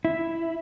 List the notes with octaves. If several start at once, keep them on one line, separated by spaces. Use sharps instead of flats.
E4